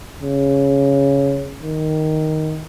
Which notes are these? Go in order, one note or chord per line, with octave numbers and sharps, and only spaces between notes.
C#3
D#3